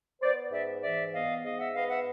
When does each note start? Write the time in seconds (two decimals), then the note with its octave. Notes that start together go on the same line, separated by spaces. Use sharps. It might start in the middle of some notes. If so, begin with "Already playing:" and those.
0.21 B3 C5 D5
0.51 G#2 D5 E5
0.82 E3 D5 E5
1.12 B3 D#5 F5
1.43 G#2 D#5 F5
1.58 E5 F#5
1.74 B3 D#5 F5
1.89 E5 F#5